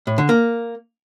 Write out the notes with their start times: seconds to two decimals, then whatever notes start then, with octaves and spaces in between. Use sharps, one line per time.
0.07 A2
0.18 D3
0.29 A#3